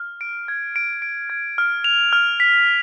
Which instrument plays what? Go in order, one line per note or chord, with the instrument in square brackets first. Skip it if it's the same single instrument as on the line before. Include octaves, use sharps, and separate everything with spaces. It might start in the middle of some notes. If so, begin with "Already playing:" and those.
Already playing: [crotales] F6
D7
G#6
D7
D7
G#6
F6
F7
F6
B6